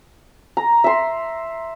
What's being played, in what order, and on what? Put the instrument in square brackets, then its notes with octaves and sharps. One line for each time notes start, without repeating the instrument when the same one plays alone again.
[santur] A#5
E5 C6